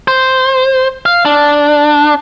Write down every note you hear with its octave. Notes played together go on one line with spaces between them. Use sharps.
C5
F5
D4